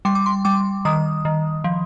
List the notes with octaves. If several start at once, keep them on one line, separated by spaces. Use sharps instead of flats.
G3 C6
D6
C6
G3 D6
D#3 D#6
D#3
F3